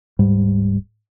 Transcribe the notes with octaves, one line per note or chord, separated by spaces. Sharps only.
D1 G#2 G3